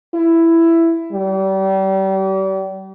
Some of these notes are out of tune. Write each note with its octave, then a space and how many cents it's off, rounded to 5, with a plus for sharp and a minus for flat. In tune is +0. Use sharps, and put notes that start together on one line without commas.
E4 +10
G3 -35